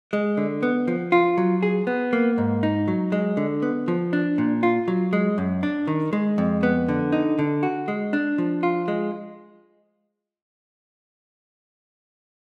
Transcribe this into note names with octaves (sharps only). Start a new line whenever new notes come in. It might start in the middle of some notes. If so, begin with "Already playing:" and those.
G#3
D3
B3
F3
F4
F#3
G#4
B3
A#3
G#2
D#4
F#3
G#3
D3
B3
F3
D4
A#2
F4
F#3
G#3
F#2
D4
D#3
G#3
F2
B3
D3
D#4
D3
F#4
G#3
D4
F3
F4
G#3